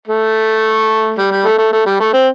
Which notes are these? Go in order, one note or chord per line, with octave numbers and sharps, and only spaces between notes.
A3
G3
G3
A3
A3
A3
G3
A3
C4